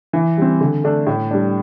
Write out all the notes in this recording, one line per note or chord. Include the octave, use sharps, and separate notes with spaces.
E3
G3 C4
D3
A3 D4 A4
A2
G3 D4